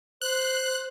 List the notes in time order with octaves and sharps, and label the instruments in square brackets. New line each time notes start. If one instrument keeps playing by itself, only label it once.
[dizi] C5 [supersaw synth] F#6